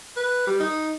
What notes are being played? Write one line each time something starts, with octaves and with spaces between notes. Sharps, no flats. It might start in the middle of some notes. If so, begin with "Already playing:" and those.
B4
G3
D#4